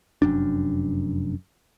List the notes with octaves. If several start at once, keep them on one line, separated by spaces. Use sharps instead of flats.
F1 F#2 D4